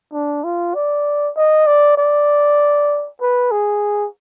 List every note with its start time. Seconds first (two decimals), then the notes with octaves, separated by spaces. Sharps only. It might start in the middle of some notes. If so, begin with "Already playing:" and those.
0.13 D4
0.44 F4
0.75 D5
1.36 D#5
1.67 D5
1.98 D5
3.21 B4
3.51 G#4